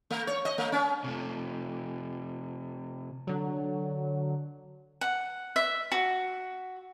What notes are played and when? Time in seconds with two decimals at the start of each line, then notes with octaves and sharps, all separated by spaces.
0.10 A3
0.27 C#5
0.45 D#5
0.58 A3
0.72 C#4
1.04 C3 A3
3.27 D3 F#3
5.01 F#5
5.56 E5
5.92 F#4